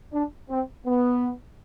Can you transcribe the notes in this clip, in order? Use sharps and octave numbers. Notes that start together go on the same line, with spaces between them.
D4
C4
B3